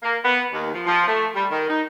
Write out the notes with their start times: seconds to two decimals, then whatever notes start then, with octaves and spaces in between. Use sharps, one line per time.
0.03 A#3
0.24 B3
0.52 D#2
0.74 F3
0.87 F3
1.07 A3
1.35 G3
1.51 D#3
1.70 D#4